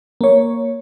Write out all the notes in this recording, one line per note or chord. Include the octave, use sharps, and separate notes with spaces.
A#3 C#5